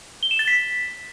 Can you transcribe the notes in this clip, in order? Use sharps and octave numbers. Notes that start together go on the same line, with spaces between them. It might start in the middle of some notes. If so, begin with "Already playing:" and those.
G7
E7
A6
B6